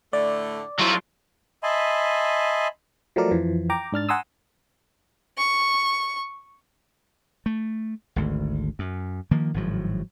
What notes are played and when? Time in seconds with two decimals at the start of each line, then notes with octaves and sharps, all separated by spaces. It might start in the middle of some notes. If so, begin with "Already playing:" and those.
0.13 A2 D3 A3 D5
0.79 F2 F#3 G3 E4 F4
1.63 D#5 E5 G#5 A5 B5 C6
3.16 F3 F#3 A3 A#4 D5
3.31 F2 E3 F3
3.70 G5 A#5 D6
3.92 G#2 D4 F6 A6
4.09 F#5 G#5 A#5 C6 D#6 E6
5.38 C#6
7.46 A3
8.16 G#1 D2
8.79 F#2
9.31 D#3 F3 A#3
9.54 G#1 A2 F3 F#3